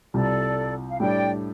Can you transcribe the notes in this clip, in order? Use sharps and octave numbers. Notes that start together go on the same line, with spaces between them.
C2 C3 G3 F4 A4 D5
F5
A2 G3 D4 D5 G5